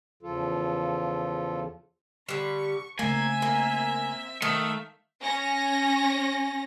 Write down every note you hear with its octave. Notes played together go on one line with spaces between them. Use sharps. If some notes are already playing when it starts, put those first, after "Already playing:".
E2 C#3 F3 F4 A4
D3 G3 C#6
C#3 A3 A#3 C4 E5 G#5
A#3
D#3 A3 E5 F5
C#4 A#6